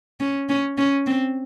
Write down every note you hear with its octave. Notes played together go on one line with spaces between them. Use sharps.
C#4
C#4
C#4
C4